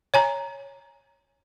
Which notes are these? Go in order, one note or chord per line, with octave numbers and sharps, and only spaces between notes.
C#5 G#5 A#5